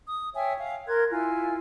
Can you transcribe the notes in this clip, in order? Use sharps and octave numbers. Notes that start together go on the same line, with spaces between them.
D#6
C#5 E5 G5 G#5
F5
A#4 C6 F#6 G#6
E4 F4 G#5